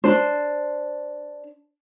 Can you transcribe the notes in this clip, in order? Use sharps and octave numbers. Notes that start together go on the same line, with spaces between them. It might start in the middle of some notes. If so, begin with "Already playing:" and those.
D4 C5